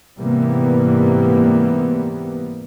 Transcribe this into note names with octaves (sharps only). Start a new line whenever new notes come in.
G#2 C3 E3 G3 A#3 B3